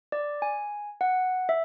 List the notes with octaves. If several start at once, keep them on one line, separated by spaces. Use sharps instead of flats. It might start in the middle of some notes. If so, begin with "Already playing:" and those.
D5
G#5
F#5
E5